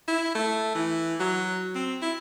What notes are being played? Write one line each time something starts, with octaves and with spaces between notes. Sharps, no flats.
E4
A3
E3
F#3
C4
E4